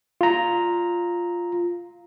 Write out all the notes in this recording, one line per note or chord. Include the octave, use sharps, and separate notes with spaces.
F4 A#5